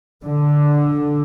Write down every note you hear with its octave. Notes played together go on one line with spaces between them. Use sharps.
D3